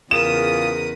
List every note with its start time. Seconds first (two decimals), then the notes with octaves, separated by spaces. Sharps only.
0.11 E2 C#3 F4 G#4 A#4 B4 D#6 E7